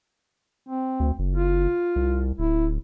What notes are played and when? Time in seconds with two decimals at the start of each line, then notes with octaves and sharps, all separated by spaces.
0.69 C4
1.00 D2
1.19 F#1
1.35 F4
1.96 C2
2.38 D1 E4